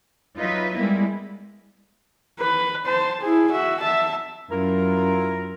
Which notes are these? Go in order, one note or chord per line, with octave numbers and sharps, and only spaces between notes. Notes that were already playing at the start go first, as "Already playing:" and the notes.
F#3 D#4 F4 B4 D#5 E5
G3 G#3 A#3 B3 E4
B4
C5 A5
E4 G#4
F#4 E5
E5 A5
F#2 E4 F4 A#4